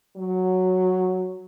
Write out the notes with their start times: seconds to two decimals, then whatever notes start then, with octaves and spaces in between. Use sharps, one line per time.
0.17 F#3